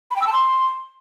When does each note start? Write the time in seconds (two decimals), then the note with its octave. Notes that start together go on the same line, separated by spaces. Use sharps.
0.11 B5
0.16 G5
0.22 E6
0.27 A5
0.32 C6